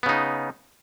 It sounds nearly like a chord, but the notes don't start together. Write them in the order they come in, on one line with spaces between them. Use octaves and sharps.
B3 C#3 D#4